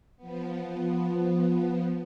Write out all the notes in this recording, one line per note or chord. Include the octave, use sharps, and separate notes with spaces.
F3 B3